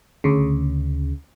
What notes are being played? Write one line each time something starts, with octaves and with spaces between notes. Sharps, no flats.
D2 C#3